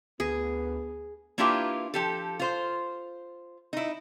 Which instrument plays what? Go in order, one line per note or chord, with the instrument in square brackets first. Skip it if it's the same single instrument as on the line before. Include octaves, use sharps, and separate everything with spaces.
[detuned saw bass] D2 [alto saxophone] B3 [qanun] G#4
[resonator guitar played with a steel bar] A#3 D4 E4 F4 G4 B4
F3 G4 A4
F4 C5
D#4 E4